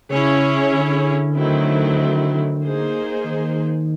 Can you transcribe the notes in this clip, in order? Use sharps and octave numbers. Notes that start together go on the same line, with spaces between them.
C#3 C#4 E4 G#4 C#5
D3
D#3 F#3 A3 C4 E4
A#3 D#4 G#4 C5
D#3